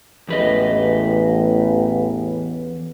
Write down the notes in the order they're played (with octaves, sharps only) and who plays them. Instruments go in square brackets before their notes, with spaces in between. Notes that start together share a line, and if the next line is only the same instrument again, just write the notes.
[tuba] A1 [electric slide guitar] E2 B4 D#5